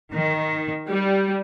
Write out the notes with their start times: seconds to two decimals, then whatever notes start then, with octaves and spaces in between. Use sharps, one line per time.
0.12 D#3
0.88 G3